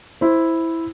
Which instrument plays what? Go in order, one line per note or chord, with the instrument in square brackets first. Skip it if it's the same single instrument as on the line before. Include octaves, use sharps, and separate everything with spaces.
[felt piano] E4 C5